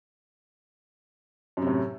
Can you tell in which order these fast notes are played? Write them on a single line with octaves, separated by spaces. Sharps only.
F#2 C3 A2